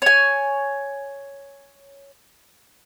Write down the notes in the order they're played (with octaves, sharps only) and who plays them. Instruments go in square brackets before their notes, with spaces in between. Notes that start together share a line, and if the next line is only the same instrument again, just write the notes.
[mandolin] C#5 G#5